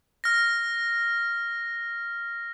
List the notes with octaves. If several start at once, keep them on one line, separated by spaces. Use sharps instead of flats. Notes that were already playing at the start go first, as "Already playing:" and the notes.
F6 A#6